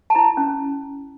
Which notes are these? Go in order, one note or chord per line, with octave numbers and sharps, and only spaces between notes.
A5
E4 A#5
C#4